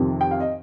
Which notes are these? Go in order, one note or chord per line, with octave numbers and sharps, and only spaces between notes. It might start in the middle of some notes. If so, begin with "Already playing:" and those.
Already playing: F2 C3 D#3
G5
F5
D#5